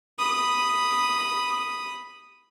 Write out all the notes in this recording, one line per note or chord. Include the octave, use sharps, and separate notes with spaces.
B5 D#6